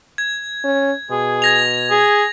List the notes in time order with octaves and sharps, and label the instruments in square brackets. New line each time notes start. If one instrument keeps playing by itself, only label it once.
[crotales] G#6
[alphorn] C#4
[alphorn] B2 [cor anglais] G#4
[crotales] G#6 A#6 F7
[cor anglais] G#4